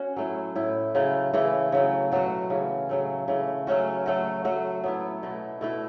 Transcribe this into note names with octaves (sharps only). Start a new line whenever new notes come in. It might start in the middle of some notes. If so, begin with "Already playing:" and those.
Already playing: C#4 F#4
F#3 A3 E4
A2 A3 E4
C#3 F#3 A3 E4
C#3 E3 A3 E4
C#3 F#3 A3
B2 F#3 A3 F#4
C#3 E3 C#4
C#3 F#3 A3
C#3 E3 A3
F#3 A3 C#4 F#4
F#3 A3 F#4
F#3 A3 F#4
F#3 B3 E4
B2 A3 E4
B2 A3 E4